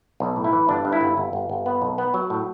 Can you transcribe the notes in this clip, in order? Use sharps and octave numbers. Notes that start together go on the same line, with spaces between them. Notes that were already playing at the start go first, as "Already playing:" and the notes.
B1
A2
E4
E3
G1 D4
G2
E4
G1
G1
G1
G1
B3
B1
B3
F#3
A2